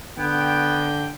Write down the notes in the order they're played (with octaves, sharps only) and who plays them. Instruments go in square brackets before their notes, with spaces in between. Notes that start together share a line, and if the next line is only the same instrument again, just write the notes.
[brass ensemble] D3 G5 [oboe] B3